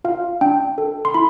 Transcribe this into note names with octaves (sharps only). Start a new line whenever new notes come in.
F4 F5
D4 G5
A4
C6
E4 B5